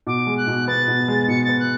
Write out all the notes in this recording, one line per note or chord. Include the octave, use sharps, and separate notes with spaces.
B2 D6
G#3
F#6
B2
B3 A6
B2
G#3
B2 C#7
B3 A6
F#6